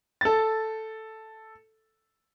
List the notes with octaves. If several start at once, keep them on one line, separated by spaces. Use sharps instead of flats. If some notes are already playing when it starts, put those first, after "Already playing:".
A4 A6